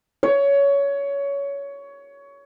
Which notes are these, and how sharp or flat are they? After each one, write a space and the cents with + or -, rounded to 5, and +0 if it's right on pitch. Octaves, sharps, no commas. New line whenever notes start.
C#5 +20